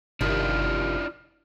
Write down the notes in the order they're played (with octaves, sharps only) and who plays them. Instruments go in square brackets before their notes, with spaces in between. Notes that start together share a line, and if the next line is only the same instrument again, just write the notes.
[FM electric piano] G1 [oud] C3 D#3 F3 [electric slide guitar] D4 E4 F4 [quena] F6